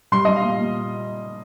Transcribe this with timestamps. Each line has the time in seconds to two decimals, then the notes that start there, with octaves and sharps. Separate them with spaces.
0.12 G3 C6
0.25 G3 D#5
0.36 F5
0.43 A#2
0.59 A#2